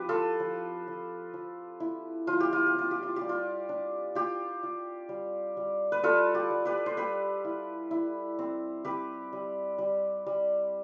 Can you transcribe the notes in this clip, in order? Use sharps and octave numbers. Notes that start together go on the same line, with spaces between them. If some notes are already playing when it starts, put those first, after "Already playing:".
Already playing: F3 C4 G4 B4
F4 A4
F3
F3
F3
E4
F3 F4
G4
F4
G4
C4 F4
G4
F4
G4
G3
F4
D4
F4 G4
F4
G3
G3
B4
G3 F4 A4
G4
G3
G4 B4
C5
G3 G4 B4
E4
E4
C4
C4 G4 B4
G3
G3
G3